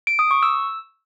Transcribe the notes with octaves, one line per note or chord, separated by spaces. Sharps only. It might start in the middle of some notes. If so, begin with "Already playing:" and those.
D7
D#6
C#6
E6